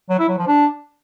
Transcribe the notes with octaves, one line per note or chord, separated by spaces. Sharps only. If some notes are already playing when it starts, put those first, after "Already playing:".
F#3
E4
F#3
F3
D4